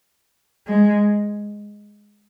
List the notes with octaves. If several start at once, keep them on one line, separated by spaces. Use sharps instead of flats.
G#3